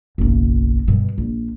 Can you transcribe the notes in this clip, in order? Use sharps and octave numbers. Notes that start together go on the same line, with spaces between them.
F#1 B1
G2 B2
A#1